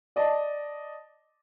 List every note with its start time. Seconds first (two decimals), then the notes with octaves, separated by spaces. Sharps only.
0.16 D5 D#5 A5